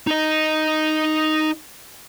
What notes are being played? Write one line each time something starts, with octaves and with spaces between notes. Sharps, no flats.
D#4 D#5